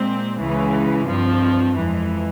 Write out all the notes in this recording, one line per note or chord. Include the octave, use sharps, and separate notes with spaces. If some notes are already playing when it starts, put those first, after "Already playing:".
Already playing: A#2 G#3 C4
C#2 C#3 E3 G#3
G2 F3 C4
F2 E3 G#3